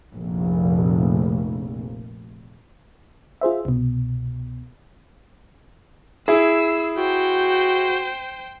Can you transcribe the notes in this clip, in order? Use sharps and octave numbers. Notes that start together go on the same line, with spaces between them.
F1 A#1
F4 G#4 C5 E5
C2 B2
E4 G#4 E6 C7
F#4 C5 G5